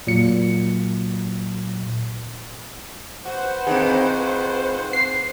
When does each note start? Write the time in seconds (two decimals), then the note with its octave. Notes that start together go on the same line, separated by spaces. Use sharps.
0.07 A#2 F#3 C#7
3.25 F#4 B4 C5 F#5
3.67 F2 D#3 E3 C4 D#4 G#4
4.93 C7